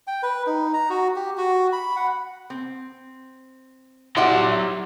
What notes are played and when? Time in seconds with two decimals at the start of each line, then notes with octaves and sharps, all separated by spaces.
0.07 G5
0.23 B4
0.47 D#4
0.74 A#5
0.90 F#4
1.16 G4
1.37 F#4
1.73 B5
1.96 F#5
2.50 C4
4.17 F#3 E4 G4 D5 E5 F#5 C6